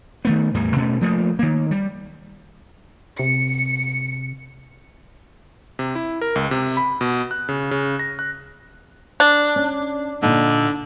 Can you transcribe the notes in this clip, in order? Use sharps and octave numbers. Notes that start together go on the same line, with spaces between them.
D#3 A3 B3
E2 A2 E3 G3
B2 A3 C#4
F3 A3 A#3
D#3 A#3
G3
C3 C#7
C3
E4
A#4
C#2
C3
B5
B2
F#6
C#3
C#3
A#6
F#6
D4
C#4
A#2 D3 D#4